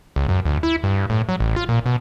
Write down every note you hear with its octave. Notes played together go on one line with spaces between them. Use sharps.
C#2
F#2
D2
E4
G2
A2
F#3
A1
F4
A#2
B2